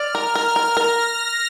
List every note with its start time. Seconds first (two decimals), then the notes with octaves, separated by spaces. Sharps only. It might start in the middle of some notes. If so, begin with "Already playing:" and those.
Already playing: D5 F6
0.15 A#4
0.35 A#4
0.56 A#4 A#6
0.77 A#4